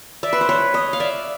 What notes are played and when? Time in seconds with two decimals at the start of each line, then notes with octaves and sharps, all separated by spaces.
0.23 D5 E5
0.33 B4
0.41 C5
0.49 B4 C#5
0.74 C#5 D#5
0.93 F5
1.00 D5 E5